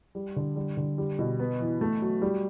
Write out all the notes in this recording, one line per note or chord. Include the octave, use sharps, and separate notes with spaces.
G3
D3
G3
D3
G3
B2
B3
E3
A3
F#3
G3